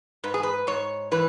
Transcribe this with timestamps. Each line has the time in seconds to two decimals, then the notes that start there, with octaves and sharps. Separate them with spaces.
0.24 G#2 B4
0.34 G#4
0.43 B4
0.67 G#2 C#5
1.11 E3 B4